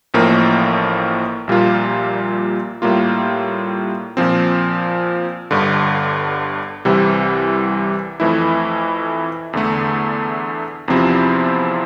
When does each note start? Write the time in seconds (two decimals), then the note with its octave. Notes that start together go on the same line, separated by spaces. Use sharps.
0.14 A1 A2 F3 A#3
1.47 A#1 A#2 G3 A#3 F4
2.82 A2 G3 A#3 F4
4.17 A#2 F3 C4
5.51 G1 G2 D3
6.85 C2 C3 E3 G3
8.20 F2 E3 A3 E4
9.53 E2 D3 A3
10.88 E2 C3 F3 C4 E4